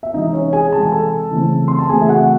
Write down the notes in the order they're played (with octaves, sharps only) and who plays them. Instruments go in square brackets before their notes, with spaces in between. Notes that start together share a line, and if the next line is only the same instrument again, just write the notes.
[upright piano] E5
C3 E3 G#3 D#4 D#5
C#4 C#5
G#4 G#5
C3 E3 G#3 A5
G#5
A4 A5
C#3 E3 A3 C4
C6
A5
C#3 E3 A3 C4 G#4 G#5
E5
F#4 F#5